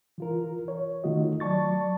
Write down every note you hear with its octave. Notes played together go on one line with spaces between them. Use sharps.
E3 F4 A#4
C#5
D#3 A3 F4 F#4 D#5
F#3 D5 A5 C#6 A6